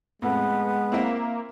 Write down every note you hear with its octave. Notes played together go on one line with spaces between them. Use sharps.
F2 A2 G#3 B3
A#3 C4 E4 E5